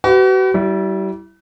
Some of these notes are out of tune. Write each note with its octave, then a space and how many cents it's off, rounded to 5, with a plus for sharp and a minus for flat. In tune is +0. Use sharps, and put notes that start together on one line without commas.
F#4 +40 B4 +25
G3 -30 E4 +0